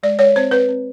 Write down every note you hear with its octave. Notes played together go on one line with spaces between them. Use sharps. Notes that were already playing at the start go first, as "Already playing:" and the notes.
G#3 D5
G#3 C#5
C4 C5
C4 B4
C4